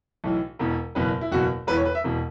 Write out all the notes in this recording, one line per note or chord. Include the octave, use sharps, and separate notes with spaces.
B1 A2 E3
E1 E2 B2
F#1 E2 B2 B4
E4
F#1 E2 B2 F#4
E1 E2 E3 B4
C#5
B4
E5
E1 E2 B2